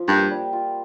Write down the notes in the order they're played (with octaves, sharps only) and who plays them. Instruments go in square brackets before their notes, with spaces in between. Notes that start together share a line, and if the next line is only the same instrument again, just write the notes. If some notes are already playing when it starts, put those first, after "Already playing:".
Already playing: [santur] F3 F4
[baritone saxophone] G2 [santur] A#3
[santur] G3
F4